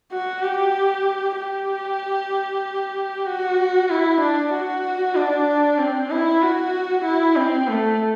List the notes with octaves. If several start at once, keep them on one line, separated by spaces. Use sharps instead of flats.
F#4
G4
G4
F#4
E4
D4
F#4
D4
C4
E4
F#4
E4
C4
A3